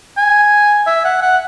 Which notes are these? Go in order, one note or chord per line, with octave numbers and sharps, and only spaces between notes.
G#5
E5
F#5
F#5